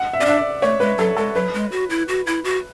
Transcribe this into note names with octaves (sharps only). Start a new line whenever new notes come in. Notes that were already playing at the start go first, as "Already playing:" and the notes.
Already playing: F#5
E5
C#4 D5
D4 E5
D5
A3 C#5
G#3 B4
F#3 A4
G#3 A4
F#3 B4
G#3
F#4
E4
F#4
E4
F#4